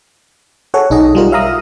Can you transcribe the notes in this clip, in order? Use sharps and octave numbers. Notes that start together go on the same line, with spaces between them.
G#4 A4 C#5 F#5
B1 D#4 G#4 D#5
G3 F4 A#4
E5 F5 A#5 D#6